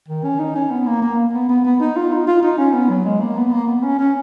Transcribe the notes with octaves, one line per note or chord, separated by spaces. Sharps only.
D#3
C#4
D#4
C#4
B3
A#3
A#3
B3
B3
B3
D#4
F4
D#4
F4
D#4
C#4
B3
F#3
G#3
A#3
B3
A#3
B3
C#4
C#4